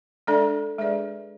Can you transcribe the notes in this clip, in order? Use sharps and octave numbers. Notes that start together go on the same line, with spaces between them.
G#3 D4 A4 D5
G#3 D4 G#4 B4 D5